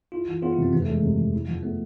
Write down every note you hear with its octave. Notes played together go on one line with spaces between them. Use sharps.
E4 F4
E3
B3 F4
E4
C3 C4
F1 B3
A3
E2
G#3
C3
F1
E4
F3
A3 B3